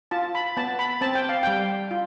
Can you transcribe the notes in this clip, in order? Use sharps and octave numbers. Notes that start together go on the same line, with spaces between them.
F4 A5
B5
B3 A5
B5
C4 A5
G5
F5
G3 G5
F4